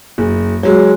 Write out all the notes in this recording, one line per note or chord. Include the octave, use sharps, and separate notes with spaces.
F#1
F#3 G#3